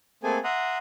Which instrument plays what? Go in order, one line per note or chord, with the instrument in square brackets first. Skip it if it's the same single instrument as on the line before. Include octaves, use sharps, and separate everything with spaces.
[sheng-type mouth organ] A3 A#3 C4 G#4 A4 G#5
E5 F#5 A#5 C6 D#6